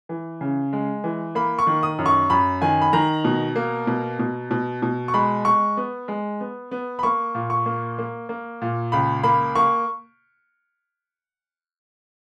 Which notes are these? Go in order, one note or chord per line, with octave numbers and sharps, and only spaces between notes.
E3
C#3
G#3
E3
A#3 B5
C#6
D#3
D#6
F#2
C#6
F#2 B5
D#3 G#5
B5
D#3 A#5
B2
A#3
B2
B2
B2
B2
C#6
G#3 B5
G#3 C#6
B3
G#3
B3
B3
B5
A#3 C#6
A#2
C#6
A#3
A#3
A#3
A#2
C#2 B5
A#3 B5
A#3 C#6